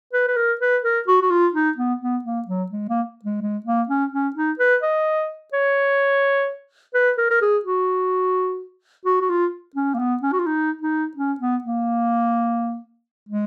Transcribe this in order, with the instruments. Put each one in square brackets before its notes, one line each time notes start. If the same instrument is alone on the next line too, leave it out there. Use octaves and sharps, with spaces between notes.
[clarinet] B4
B4
A#4
B4
A#4
F#4
F#4
F4
D#4
B3
B3
A#3
F#3
G#3
A#3
G#3
G#3
A#3
C#4
C#4
D#4
B4
D#5
C#5
B4
A#4
A#4
G#4
F#4
F#4
F#4
F4
C#4
A#3
B3
C#4
F#4
F4
D#4
D#4
C#4
B3
A#3
G#3